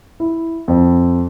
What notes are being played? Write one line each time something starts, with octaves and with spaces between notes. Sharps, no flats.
E4
F2